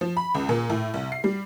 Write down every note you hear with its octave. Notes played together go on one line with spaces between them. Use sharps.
F3
B5
C#2
A#2
A2
C2
C7
G3